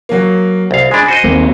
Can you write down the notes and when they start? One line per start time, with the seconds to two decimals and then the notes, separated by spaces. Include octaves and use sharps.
0.09 F#3 A#3
0.71 C2 F5
0.91 G#3 D4 G#5 B5
1.08 F#4 C5 D#5
1.24 D#2 A#3 C4